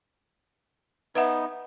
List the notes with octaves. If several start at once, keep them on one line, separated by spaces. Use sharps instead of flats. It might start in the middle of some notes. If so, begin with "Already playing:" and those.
B3 D#4 B4 E5 F#5